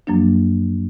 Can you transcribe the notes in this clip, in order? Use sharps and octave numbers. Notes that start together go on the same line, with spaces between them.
F#2 F3 F#3 A#3 D4